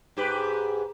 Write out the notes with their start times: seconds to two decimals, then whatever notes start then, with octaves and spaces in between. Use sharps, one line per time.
0.17 G#2 G4 B4